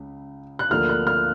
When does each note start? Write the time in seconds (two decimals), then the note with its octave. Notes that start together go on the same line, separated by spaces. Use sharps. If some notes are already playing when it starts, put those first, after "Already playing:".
Already playing: C#2 C#3
0.59 F#6
0.70 D2 D3 F3 A#3 D4 F6
0.89 F#6
1.07 F6